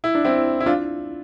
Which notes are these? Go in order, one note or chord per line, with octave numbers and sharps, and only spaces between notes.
E4
D4
C4 E4
E4
D4 F4